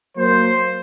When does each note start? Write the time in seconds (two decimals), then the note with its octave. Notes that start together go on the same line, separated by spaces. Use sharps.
0.16 F#3 A#3 C5